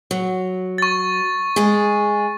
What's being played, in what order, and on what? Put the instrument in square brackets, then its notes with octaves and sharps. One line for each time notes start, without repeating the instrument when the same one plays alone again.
[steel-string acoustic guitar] F#3
[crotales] C#6 A6
[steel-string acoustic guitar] G#3 G#4